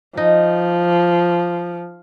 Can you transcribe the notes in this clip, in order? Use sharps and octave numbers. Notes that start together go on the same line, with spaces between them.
F3 D#4